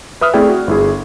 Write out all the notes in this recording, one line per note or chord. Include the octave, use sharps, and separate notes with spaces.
B4 E5 D#6 F6
A3 C4 E4 G#4 D5 G5
F#4
G1 E4 G#4